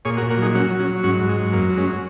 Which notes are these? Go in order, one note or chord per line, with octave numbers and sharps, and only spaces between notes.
A#2 G#4 C#5
F#4 A#4
A#2
F#4 A#4
F#3 D#4 G#4
F#3 C#4 F#4
F#3
C#4 F#4
F#3
G#2 C#4 F#4
G#2
G#3
F#3
F#2 A#3
F#3
G#3 C#4